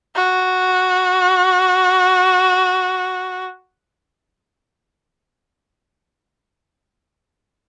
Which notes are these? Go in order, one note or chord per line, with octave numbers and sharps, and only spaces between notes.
F#4